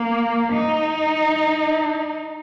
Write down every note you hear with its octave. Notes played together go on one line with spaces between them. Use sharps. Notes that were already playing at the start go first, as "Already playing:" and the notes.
Already playing: A#3
D#4